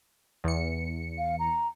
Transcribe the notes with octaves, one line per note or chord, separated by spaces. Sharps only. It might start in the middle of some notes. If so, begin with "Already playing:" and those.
E2 C#7
F5
A#5